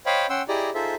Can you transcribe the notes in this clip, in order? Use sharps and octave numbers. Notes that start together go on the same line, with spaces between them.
C5 C#5 D#5 F5 G5 B5
C#4 F#5 G5 C6 E6
E4 G4 G#4 D5 D#5 A#5
D#4 F4 G#4 A4 C5 E5